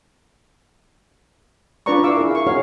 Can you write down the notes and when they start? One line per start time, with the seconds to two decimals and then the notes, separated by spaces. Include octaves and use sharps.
1.86 D4 F4 B4 D5 A#5 C#6
2.04 E4 F5 C#6 D6 E6
2.17 E4 G#4 A#4
2.31 F5 C#6
2.47 D#4 F#4 G#4 A#4 C#5 F5